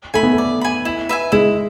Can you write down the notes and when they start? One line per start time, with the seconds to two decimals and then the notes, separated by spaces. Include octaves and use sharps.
0.14 A3 G#5 B5
0.23 B3
0.33 A3
0.38 D5
0.61 G#5 B5
0.85 E4
1.09 B4 E5 G#5
1.32 G#3 E4